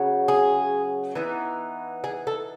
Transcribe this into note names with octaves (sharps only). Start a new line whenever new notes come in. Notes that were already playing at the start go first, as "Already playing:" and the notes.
Already playing: C#3 F#3 B3
G#4
E3 B3 D#4
G#4
A4